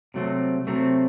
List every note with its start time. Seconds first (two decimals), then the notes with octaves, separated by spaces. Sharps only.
0.14 C3 F#3 A3 C4
0.67 C3 F#3 A3 C4